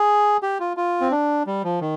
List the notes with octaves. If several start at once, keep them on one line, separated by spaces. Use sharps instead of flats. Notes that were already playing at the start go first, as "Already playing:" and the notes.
Already playing: G#4
G4
F4
F4
C4
D4
G3
F3
D#3